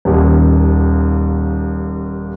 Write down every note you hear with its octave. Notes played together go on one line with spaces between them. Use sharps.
D#1 D#2